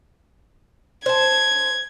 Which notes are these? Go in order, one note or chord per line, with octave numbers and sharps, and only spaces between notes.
C5 A5 G#6